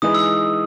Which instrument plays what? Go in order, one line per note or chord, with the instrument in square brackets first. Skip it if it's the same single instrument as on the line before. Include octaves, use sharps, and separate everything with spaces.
[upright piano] E3 G#3 D#4 G#4 B4 [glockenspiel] D#6
[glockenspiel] E6